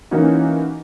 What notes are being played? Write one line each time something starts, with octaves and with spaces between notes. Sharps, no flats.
E3 A#3 C#4 D#4 F#4